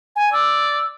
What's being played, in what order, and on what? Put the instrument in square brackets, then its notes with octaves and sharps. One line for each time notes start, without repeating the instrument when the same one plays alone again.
[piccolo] G#5
[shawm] D5 [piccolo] E6